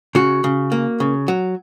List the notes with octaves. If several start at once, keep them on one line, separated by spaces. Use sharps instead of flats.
C#3 F#4
C#3
A#3
C#3
F#3